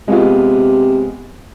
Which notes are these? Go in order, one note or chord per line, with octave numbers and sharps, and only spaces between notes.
C3 G#3 B3 F4